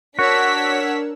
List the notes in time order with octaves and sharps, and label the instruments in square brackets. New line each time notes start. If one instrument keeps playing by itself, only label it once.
[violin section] D4 B6 [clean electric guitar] F#4 [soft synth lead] A#4 [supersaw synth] C#5 F#5 E6